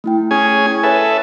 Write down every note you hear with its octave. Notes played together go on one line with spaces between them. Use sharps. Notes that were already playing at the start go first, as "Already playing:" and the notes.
A3 E4 G5
C#4 G#4 G#5
A4 B4 C#5 E5 G#5 A5